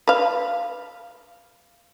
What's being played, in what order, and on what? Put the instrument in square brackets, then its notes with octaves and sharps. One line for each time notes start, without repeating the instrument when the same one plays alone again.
[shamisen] B4 F5